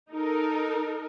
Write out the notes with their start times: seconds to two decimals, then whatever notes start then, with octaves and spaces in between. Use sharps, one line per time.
0.11 D#4 A4 A#4